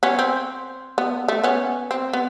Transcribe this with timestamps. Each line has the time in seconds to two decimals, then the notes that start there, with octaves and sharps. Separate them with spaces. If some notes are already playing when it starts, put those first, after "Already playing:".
0.03 B3 C#4
0.19 C4
0.98 B3
1.28 A3
1.43 B3 C#4
1.91 C4
2.13 B3